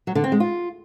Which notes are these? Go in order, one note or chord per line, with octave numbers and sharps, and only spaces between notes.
F#3
D3
C4
G#3
F4